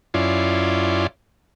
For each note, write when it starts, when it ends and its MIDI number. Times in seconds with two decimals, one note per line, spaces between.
0.14 1.07 42
0.14 1.07 61
0.14 1.07 64
0.14 1.07 65
0.14 1.07 74
0.14 1.07 84